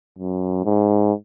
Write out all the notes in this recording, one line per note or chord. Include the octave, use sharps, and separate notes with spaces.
F#2
G#2